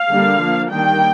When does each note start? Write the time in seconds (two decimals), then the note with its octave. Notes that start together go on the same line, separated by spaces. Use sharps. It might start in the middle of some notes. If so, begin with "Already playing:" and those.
Already playing: F5
0.11 D3 G3 A#3 D4
0.40 F3 A#3 D4
0.70 D#3 G3 A#3 D4 G5